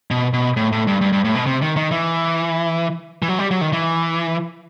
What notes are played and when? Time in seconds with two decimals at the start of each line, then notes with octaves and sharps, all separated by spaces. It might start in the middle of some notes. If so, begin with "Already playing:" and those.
0.11 B2
0.33 B2
0.57 A2
0.72 A2
0.87 G2
1.01 G2
1.12 G2
1.25 A2
1.35 B2
1.46 C3
1.62 D#3
1.77 D#3
1.92 E3
3.22 E3
3.28 F#3
3.39 G3
3.51 F#3
3.61 D#3
3.73 E3